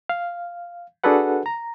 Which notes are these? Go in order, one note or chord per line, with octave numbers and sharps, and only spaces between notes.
F5
D4 F#4 G#4 A4 B4 F#5
A#5